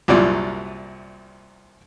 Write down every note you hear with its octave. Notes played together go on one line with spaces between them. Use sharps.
C2 F#2 A#2 G3 D5